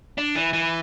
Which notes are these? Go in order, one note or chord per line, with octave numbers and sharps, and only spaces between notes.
D4
E3
E3